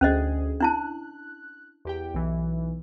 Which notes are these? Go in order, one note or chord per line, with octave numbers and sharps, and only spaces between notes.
D2 C#4 G#4 C5 D#5
D4 E4 A5 F#6
E2 G4 G5
B1 E3